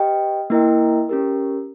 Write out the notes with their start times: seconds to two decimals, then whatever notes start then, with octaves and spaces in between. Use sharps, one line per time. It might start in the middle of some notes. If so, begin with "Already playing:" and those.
Already playing: G4 B4 D#5 G5
0.50 A#3 E4 A#4 D#5 G5
1.09 C#4 G4 A#4